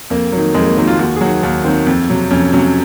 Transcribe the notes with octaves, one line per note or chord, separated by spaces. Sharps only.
F2 A#3
D#3 F#3
F2 G#3
A#3
D#3 F#3 A#3
F4
D#2 F#4
G#4
D#3 F#3 F#4
D#2 A#3
D#3 F#3 C4
F2
C3 F#3
F2 C#4
C3 F#3 C#4